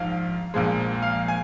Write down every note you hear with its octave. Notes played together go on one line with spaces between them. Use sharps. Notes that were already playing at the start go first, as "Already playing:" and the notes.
Already playing: A#1 G#2 F3 F5
A#1 A#2 F3 G#3
F5
G#5